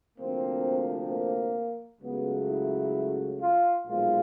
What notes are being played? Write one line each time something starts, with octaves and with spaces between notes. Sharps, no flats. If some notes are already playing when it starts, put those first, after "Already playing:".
D2 C3 F3 A#3 C4
A#3
C#2 C#3 F#3 A3 B3
E4
F4
B1 A#2 F3 G#3 F4